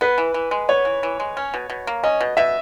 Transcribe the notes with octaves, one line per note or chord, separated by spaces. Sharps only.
B3 B4
E3
E3
G#3
B3 C#5
E3
E3
G#3
C#4
B2
B2
A#3
C#4 D#5
B2
B2 E5